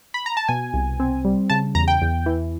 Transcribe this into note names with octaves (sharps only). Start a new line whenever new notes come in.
B5
A#5
A5
B2 G#5
C2
C4
G3
C#3 A5
E2 A#5
G5
E2
E3